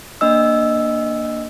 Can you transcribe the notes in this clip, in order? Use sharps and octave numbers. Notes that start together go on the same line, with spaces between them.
A#3 D4 D#5 E6